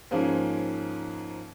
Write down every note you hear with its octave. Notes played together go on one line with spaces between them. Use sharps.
G#2 F3 A#3 C#4 G#4